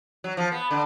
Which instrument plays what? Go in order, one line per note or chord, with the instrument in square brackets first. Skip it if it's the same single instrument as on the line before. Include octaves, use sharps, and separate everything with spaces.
[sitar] F#3
F3
B3
D3